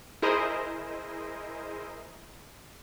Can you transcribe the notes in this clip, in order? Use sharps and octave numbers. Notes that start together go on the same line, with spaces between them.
E4 G#4 A#4 C5 D#5